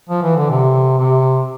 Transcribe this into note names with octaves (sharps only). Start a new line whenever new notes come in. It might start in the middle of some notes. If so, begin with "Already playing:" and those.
F3
E3
D3
C3
C3